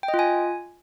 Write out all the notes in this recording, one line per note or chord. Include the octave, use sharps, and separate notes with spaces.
G5
D#5
F4
G#5